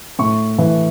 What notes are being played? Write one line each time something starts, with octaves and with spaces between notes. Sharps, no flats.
A2 C#6
E3